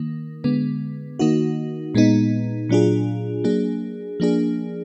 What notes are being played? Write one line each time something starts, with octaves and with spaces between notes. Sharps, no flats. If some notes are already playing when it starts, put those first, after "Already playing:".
Already playing: D#3 A#3
D3 G#3 B3
D#3 A#3 D#4 F#4
A#2 G#3 B3 D#4
A#2 F#3 D4 F4 G#4
F#3 A#3 D4 G#4
F3 A#3 D4 G#4